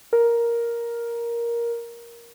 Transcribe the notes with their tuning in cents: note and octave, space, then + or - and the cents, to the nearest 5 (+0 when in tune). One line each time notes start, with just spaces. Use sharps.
A#4 +5